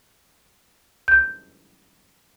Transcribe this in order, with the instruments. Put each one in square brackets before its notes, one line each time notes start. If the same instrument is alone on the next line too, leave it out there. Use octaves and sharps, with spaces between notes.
[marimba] G6